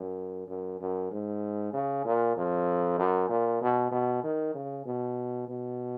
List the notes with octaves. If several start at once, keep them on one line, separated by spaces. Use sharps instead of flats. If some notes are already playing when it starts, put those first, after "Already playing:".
Already playing: F#2
F#2
F#2
G#2
C#3
A#2
F2
F#2
A#2
B2
B2
D#3
C#3
B2
B2